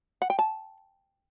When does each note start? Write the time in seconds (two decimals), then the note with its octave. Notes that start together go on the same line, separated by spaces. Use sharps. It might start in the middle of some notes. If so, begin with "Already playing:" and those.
0.22 F#5
0.30 G5
0.39 A5